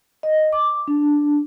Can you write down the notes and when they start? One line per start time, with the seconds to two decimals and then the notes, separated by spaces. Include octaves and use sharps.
0.23 D#5
0.53 D6
0.88 D4